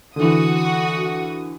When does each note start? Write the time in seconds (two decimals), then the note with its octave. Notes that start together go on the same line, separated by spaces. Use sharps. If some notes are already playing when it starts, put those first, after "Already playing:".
0.16 D3 E3 F#4 D#6